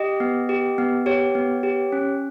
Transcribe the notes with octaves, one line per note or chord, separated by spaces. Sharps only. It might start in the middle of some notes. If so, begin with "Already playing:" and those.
Already playing: G4 D#5
B3
G4
B3
G4 C#5
B3
G4
C#4